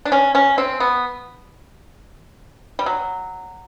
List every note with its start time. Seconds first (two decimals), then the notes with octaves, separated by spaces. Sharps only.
0.05 D4
0.12 C#4
0.35 C#4
0.58 C4
0.80 B3
2.79 G3
2.86 F#3